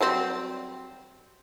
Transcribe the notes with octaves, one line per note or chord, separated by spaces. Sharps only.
F#3 G3 C4